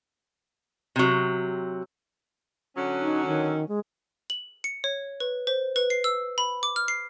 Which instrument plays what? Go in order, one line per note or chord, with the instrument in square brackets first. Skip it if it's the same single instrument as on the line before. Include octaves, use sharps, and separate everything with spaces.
[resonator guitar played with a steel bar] C3 F#3
[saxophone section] D3 F#3 C#4
[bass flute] D#4
D#3
G#3
[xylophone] F#7
C#7
C#5
B4
C5
B4
C7
E6
B5
D6
F6
C7